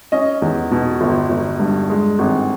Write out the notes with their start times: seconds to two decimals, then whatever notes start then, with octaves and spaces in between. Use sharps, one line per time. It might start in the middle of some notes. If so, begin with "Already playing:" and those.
0.12 C#4 D#5
0.42 E2
0.71 B2
1.01 G1
1.30 G1
1.59 G2
1.90 G#3
2.19 G#1